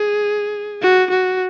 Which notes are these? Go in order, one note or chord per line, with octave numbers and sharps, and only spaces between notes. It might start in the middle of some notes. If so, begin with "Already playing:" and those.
Already playing: G#4
F#4
F#4